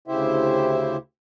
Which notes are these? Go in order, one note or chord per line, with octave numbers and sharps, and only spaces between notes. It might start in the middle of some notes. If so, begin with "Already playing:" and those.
D2 C#3 E4 G4 C5 E5